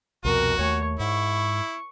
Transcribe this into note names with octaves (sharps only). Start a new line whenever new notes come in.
C2 F2 B2 F#4 A#4
D#2 A3 C#5
G#2 E4 C#6